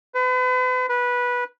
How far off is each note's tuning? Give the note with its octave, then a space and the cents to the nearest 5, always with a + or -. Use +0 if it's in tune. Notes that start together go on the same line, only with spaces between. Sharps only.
B4 +40
B4 -15